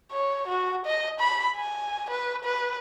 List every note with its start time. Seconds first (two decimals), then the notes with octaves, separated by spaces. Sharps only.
0.12 C#5
0.48 F#4
0.86 D#5
1.20 B5
1.57 G#5
2.10 B4
2.44 B4